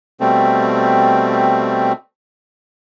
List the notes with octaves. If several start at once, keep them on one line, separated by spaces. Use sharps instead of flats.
B2 G3 A3 C4